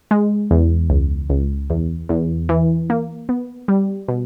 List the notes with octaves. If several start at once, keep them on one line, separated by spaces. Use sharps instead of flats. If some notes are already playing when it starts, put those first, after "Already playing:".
G#3
E2
C#2
C#2
E2
E2
E3
A#3
B3
G3
B2